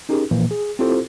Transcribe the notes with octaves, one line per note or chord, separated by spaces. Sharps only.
C#4 D#4 G4 G#4 A#4
A#2 E3 F3 A#3
G#4
C4 E4 F4 G4 A4 C5